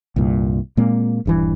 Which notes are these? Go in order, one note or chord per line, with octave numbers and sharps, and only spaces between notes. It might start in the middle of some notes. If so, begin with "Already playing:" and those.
C2 G2 A#2
A#2 G#3 A#3 C4
D#1 G2 E3